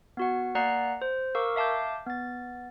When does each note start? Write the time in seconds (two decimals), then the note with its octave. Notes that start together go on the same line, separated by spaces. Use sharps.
0.17 B3 F#4 F#5
0.55 A#3 D5 F#5 A#5 F#6 C7
1.02 C5
1.35 A#4 F5 C#6 D6 E6
1.56 E5 F5 A5 D6 G6
2.07 B3 A6